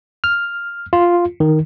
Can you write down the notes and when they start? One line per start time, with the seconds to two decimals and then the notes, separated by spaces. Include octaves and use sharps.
0.24 F6
0.93 F4
1.40 D#3